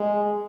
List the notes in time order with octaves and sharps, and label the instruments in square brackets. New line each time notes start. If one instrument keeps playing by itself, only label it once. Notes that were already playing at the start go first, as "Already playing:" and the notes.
Already playing: [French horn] G#3